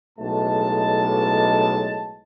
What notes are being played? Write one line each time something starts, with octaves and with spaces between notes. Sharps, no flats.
B1 A2 G#3 A5